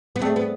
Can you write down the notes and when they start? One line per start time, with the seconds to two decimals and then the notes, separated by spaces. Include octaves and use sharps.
0.16 B3
0.22 A3 C4 G#4 D5
0.36 B3